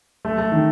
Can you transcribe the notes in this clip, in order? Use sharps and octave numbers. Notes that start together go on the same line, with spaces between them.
A3
A3
D#3